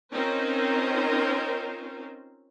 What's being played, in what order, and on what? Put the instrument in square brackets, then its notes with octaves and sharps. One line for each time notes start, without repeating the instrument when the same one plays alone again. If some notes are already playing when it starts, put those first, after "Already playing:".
[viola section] C4 C#4 D#4 F4 A#4 C5